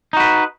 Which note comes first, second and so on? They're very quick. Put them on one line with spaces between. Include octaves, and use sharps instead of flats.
D#4 F#4 B4